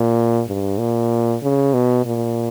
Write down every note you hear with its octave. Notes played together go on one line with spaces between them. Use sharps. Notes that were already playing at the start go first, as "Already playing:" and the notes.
Already playing: A#2
G2
A#2
C#3
B2
A#2